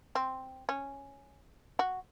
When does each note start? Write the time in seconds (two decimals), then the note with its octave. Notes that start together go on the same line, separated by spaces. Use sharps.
0.15 C4
0.69 C#4
1.79 F#4